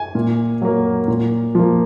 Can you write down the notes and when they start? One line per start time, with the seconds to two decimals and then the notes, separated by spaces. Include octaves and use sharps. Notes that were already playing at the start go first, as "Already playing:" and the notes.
Already playing: G#5
0.15 A#2
0.62 F#3 A#3
1.08 A#2
1.55 F3 A#3